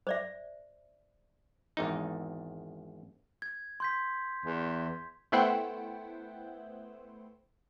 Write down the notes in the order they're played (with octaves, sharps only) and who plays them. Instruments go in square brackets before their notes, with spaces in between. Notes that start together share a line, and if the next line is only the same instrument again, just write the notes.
[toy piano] C5 D5 E5
[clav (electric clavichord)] G#1 E2 D#4
[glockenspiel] G#6
C6 G6 B6
[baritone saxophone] E2
[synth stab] A3 B3 E4 C5 F#5 G5